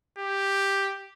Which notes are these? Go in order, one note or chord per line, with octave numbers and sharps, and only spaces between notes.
G4